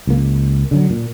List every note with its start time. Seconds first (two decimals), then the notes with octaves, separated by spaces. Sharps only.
0.07 C#2 A#3
0.71 D3 D#3 F#3
0.90 A#2